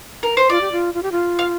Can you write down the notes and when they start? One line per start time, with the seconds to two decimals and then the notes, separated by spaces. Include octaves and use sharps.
0.23 A#4
0.37 C5
0.50 F4 D5
0.61 G4
0.72 F4
0.94 F4
1.03 G4
1.12 F4
1.39 F5